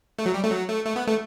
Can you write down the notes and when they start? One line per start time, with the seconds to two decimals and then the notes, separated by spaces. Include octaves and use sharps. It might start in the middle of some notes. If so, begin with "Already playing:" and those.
0.19 A3
0.26 F#3
0.34 G3
0.43 A3
0.51 F#3
0.68 A3
0.85 A3
0.96 B3
1.07 A3